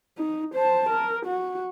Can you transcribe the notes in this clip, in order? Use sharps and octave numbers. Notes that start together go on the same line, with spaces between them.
D#4
C5 A5
A#4
F#4